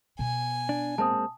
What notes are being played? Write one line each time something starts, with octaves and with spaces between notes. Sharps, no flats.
B2 G#5
D4
G#3 A#3 C4 A5 D#6